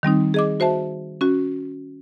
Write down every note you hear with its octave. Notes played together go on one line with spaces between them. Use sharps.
D#3 G3 C4 D#4
G#4 D#5 D6
F#4 C5 E5 A5
C#4 F#4